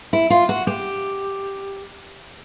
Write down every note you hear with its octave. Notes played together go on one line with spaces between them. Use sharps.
E4
F4
F#4
G4